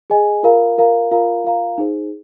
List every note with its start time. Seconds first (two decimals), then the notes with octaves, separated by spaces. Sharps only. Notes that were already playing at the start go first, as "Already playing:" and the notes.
0.10 G#4 D#5 G#5
0.43 F4 A#4 F5 A#5
0.78 F4 A#4 F5 A#5
1.11 F4 A#4 F5 A#5
1.44 F4 A#4 F5 A#5
1.78 D#4 G#4 C5